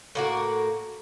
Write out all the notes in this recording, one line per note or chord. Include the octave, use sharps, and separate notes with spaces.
A2 A#3 F#4